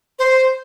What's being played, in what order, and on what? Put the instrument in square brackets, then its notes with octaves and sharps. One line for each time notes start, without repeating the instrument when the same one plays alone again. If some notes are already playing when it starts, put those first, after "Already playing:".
[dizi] C5